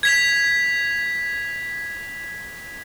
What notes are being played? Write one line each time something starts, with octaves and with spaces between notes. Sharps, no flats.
G#6 B6 F7